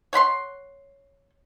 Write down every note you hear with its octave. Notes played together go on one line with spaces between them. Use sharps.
C#5 F#5 B5 C6